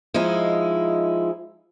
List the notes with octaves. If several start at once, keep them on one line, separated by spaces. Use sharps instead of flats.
F3 G#3 D#4 E4